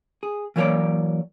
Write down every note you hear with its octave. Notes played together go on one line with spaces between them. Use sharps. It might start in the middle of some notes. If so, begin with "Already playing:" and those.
G#4
E3 F#3 A#3 A4 C#5 D5